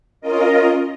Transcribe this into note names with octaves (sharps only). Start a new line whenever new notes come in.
C#4 F4 A#4 D#5